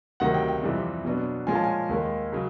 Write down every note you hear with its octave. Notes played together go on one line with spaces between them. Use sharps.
D2 C3 D#3 F#3 F#5
G5
G5
F2 C3 E3 G3 C4
B2 F#3 B3 D4
A#2 F3 G#3 C#4 F4 G#5
A5
G#5
D#2 D#3 G#3
C#3 F#3